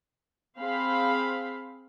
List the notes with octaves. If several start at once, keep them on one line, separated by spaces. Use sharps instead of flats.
C4 G#4 C5 F5 B5